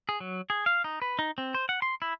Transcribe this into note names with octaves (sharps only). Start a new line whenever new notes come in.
G#4
F#3
G#4
F5
D#4
B4
D#4
C4
C5
F#5
C6
E4